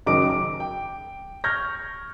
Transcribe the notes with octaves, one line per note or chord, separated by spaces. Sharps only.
F#1 F#2 D#3 D#5 D6 D7
D6
G5
C#6 F6 G6 G#6 A#6